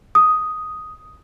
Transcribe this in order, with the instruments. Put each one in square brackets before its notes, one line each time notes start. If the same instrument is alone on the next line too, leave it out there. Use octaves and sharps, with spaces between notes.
[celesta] D#6